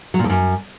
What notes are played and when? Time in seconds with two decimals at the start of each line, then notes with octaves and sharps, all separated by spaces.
0.14 F#3
0.19 A#2
0.24 F2
0.29 F#2